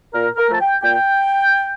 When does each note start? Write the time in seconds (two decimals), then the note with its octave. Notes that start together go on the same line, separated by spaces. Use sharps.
0.14 A#2 A#4
0.37 A#4
0.49 F3 A3 A5
0.60 G5
0.83 A#2 G5